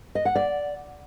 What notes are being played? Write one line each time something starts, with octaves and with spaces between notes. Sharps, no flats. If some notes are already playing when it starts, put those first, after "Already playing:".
D#5
F#5
D5